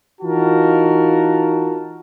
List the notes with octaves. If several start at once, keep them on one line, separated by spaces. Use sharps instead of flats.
E3 D#4 F4 F#4 A#4 A5